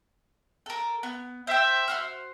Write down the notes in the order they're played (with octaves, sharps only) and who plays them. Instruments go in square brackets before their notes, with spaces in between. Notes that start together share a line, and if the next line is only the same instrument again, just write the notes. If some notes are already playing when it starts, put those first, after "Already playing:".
[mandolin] A4 A#4
B3
[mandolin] C5 G5 [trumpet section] E5
[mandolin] F#4 C5 F6